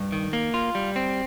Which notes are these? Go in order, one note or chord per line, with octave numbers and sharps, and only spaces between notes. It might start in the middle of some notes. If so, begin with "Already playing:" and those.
Already playing: G2
D#3
A#3
F4
G3
C4